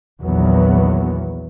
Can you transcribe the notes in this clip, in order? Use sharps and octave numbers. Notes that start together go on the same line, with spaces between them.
A#1 E2 D#3 F#3 B3